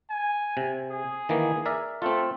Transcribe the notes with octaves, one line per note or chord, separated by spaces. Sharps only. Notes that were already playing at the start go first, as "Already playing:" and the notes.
G#5
C3
G#4
D#3 E3 A#3
A#4 D5 E5
A3 C4 F4